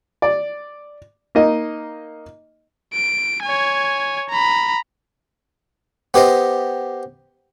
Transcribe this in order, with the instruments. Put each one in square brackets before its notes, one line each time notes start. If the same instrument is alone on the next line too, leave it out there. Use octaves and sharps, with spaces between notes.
[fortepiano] D5
A#3 D#4 D#5
[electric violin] D7
C#5 G#5
A#5 B5
[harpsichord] B3 G4 C5 D#5